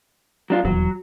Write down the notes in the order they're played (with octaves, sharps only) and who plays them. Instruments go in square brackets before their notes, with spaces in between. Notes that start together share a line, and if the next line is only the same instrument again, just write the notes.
[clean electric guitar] F#3 D4 F4
[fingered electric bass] D#1 E2 [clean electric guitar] F#3